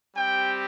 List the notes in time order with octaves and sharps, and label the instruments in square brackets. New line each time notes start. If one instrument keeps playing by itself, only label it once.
[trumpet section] G3 C4 G4 G5